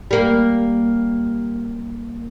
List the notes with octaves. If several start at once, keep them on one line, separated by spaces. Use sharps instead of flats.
G3 A#3